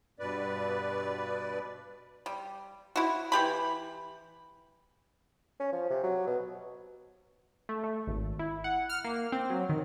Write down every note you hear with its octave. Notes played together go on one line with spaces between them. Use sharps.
G2 B2 B4 D5
G3
E4 F#4
E3 G4 B5
C#4
F3
C3
F#3
B2
A3
A3
G#1
E4
F#5
F6
A#3
C4
F#3
D#3